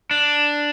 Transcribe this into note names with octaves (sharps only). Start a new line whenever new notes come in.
D4